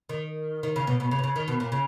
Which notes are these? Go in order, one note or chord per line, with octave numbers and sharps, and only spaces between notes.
D#3
D#3
C#3
B2
B2
C#3
B2
C#3
D#3
B2
A#2
C#3